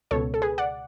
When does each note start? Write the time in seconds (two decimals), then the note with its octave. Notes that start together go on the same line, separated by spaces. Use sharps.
0.11 C#2 B2 A4 C#5
0.34 A4
0.42 G#4 B4
0.58 D5 F#5